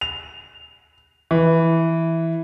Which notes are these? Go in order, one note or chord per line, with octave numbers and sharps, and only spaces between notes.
F7
E3